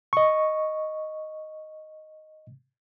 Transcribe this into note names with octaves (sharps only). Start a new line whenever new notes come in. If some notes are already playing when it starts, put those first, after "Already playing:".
D#5 C#6